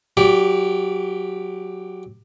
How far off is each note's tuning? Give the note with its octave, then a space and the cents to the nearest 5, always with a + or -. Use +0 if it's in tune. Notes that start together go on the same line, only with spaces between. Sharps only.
F#3 +0 G4 +10 D5 -25